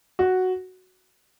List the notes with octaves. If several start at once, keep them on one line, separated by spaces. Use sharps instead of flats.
F#4